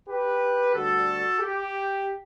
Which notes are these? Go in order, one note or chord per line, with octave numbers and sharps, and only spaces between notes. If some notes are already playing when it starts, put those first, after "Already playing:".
G4 B4
D2 D3 G3 D4 F#4 A4
G4